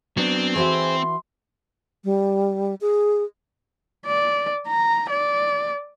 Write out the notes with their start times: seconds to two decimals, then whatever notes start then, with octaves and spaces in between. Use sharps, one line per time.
0.17 F#3 B3 C4 D4
0.56 E3 F#4 G#4 C5 E5 C6
2.05 G3
2.81 G#4
4.06 D5
4.67 A#5
5.09 D5